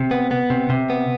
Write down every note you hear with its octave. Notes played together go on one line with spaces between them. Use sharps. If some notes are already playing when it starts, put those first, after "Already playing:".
Already playing: C3
B3
B3
C3
C3
B3